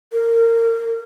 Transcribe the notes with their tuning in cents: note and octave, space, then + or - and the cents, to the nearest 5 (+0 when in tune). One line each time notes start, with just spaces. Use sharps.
A#4 -25